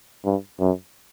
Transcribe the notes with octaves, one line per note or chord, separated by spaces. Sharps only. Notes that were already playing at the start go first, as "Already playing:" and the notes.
G2
F#2